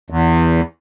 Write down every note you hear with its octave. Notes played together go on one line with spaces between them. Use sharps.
E2